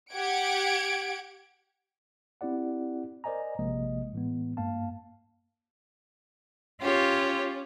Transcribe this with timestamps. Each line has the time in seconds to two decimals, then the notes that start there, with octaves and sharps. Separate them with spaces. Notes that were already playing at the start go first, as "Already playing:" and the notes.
0.12 G4 F#5 G#6 D7
2.41 C4 E4 G4 D5 F#5
3.24 A#4 C5 D5 D#5 G#5 A#5
3.59 A1 C3 F3 G#3 A#3 D#5
4.13 A2 E3 G#3 B3
4.57 G2 A#3 F5 A5
6.82 C#4 F4 G4 C#5